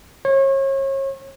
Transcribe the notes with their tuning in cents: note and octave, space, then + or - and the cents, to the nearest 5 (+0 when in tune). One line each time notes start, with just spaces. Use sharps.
C#5 -35